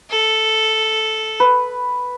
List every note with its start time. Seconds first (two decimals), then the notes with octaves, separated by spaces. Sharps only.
0.10 A4
1.40 B4